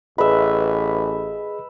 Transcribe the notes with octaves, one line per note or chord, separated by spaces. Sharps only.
A1 G#4 B4 D#5 E5